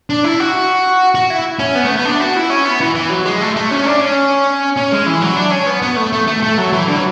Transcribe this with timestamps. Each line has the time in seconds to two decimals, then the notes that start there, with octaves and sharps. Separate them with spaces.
0.10 D4
0.24 E4
0.40 F#4
1.15 F#4
1.30 E4
1.59 C#4
1.75 B3
1.84 A3
1.96 B3
2.05 D4
2.20 F#4
2.36 E4
2.50 C#4
2.65 B3
2.81 E3
2.95 E3
3.10 F#3
3.26 G#3
3.41 A3
3.56 A3
3.71 C#4
3.86 D4
4.01 C#4
4.77 C#4
4.92 G#3
5.06 E3
5.22 F#3
5.37 D4
5.51 C#4
5.67 B3
5.82 B3
5.97 A3
6.13 A3
6.27 A3
6.43 A3
6.58 F#3
6.73 E3
6.88 D3
6.96 F#3